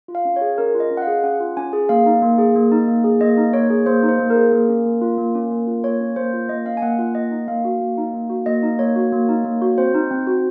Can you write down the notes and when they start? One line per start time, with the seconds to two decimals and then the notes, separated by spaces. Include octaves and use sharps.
0.08 F4
0.15 F5
0.25 C#4
0.36 G#4 C#5
0.58 C#4 A#4
0.74 F4
0.80 D#5
0.91 C#4
0.97 F#5
1.02 F5
1.07 G#4
1.24 C#4 F#5
1.40 F4
1.57 C#4 G#5
1.73 G#4
1.89 A#3 F5
2.06 D#4
2.22 A#3
2.38 G#4
2.56 A#3
2.72 D#4
2.88 A#3
3.04 G#4
3.21 A#3 D#5
3.37 D#4
3.53 A#3 C#5
3.70 G#4
3.86 A#3 C5
4.03 D#4
4.09 C5
4.20 A#3
4.30 A#4
4.36 G#4
4.52 A#3
4.69 C#4
4.85 A#3
5.01 F4
5.18 A#3
5.35 C#4
5.51 A#3
5.67 F4
5.84 A#3 C#5
6.00 C#4
6.16 A#3 C5
6.33 F4
6.49 A#3 D#5
6.66 C#4 F5
6.77 G#5
6.82 A#3 F#5
6.99 F4 F#5
7.15 A#3 D#5
7.31 D#4
7.48 A#3 F5
7.65 F#4
7.81 A#3
7.98 D#4
8.13 A#3
8.30 F#4
8.46 A#3 D#5
8.63 D#4
8.79 A#3 C#5
8.96 F#4
9.13 A#3
9.29 D#4
9.45 A#3
9.62 F#4
9.78 C4 C5
9.94 D#4
10.11 C4
10.27 F#4